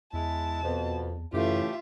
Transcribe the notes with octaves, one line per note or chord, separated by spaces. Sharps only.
E2 G#3 E4 A5
F2 B2 B3
F#2 A2 C#3 E3 A3 F4 G4 E5